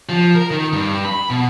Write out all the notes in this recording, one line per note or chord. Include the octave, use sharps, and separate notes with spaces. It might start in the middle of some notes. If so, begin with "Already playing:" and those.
F3
A#4
D#3
G2
B5
B2